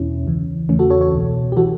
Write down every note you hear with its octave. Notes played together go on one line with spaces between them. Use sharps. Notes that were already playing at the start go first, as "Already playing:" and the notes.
Already playing: E2 B2 C#4 E4
C#2 C#3 E3
E2 C#3 E3 A3 C#4
F#4 A4
A4 C#5
A4 C#5
C#2 B2
G4
E3 F#4 A4